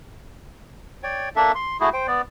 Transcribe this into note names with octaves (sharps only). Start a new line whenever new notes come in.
C#5 D5 G5
A#3 D4 A4 E5
C6
A3 E4 F#4 G#4
C5 G5
B3 D5